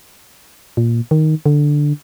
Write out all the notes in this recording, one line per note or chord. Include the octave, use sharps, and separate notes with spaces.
A#2
D#3
D3